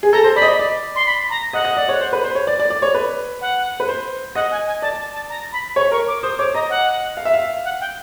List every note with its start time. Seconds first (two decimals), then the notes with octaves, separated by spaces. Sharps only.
0.03 G#4
0.12 A4 A#5
0.24 C5
0.36 D5 B5
0.42 D#5
0.48 D5
0.59 D5
0.96 C6
1.06 B5
1.30 A#5
1.53 D#5 F#5
1.65 D#5
1.77 D5
1.89 C#5
2.01 C5
2.13 B4
2.24 C5
2.35 C#5
2.47 D5
2.59 D5
2.70 D5
2.82 C#5
2.94 B4
3.41 F#5
3.80 B4
3.88 C5
4.35 D#5 F#5
4.51 G#5
4.67 G#5
4.82 D5 A5
4.98 A5
5.14 A5
5.29 A#5
5.52 B5
5.76 C#5 C#6
5.91 A#4 C#6
6.08 D6
6.23 C5 D#6
6.39 C#5 D6
6.54 D#5 A#5
6.70 F#5
7.17 F5
7.25 E5
7.33 F5
7.65 F#5
7.80 G5